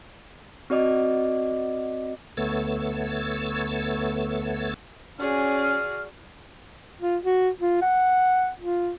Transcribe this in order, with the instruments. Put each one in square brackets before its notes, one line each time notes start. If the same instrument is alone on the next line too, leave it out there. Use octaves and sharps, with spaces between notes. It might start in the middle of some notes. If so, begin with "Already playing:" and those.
[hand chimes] C4 F#4 D5 D#5 D6
[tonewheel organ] D2 A3 B3 C#5 E6 A6
[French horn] C#4 [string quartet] F#4 G#4 D5 [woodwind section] F6
[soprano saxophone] F4
F#4
F4
F#5
F4